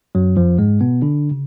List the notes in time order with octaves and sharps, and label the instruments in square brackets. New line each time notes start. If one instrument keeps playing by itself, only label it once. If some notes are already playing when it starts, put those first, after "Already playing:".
[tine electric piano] F#2 F#3
F2 F3
G#2 G#3
B2 B3
D3 D4
C#3